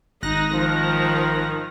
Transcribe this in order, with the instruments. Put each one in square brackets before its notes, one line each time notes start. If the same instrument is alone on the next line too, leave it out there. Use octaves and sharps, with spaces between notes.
[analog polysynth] G#1 F#6 A#6 [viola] D#4
[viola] D#3 F3